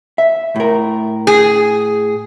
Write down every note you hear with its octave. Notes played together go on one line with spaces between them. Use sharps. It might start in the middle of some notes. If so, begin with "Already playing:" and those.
E5
A2 A#4
G#4